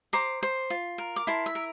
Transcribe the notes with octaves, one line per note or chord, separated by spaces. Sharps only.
C5 A#5 D6
C5
F4
A#4
D6
E4 A5 C6
E5
A#4